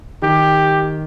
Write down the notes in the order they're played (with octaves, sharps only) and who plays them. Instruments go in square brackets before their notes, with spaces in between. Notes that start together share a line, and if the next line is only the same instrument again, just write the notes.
[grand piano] D#3 [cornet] G4